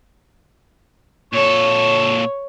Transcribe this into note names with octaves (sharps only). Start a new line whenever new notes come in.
A#2 A4 C#5